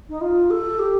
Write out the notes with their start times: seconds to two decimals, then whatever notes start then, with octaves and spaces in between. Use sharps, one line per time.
0.09 D#4
0.21 F4
0.50 A4
0.79 G4